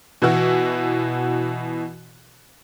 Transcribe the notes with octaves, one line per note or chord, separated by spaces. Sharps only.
B2 E3 E4 F#4